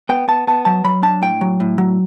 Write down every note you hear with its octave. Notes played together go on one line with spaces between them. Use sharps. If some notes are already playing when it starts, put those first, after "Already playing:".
B3 G5
B3 A5
B3 A5
F#3 A5
F#3 B5
D4 A5
A2 G5
F#3
A2
F#3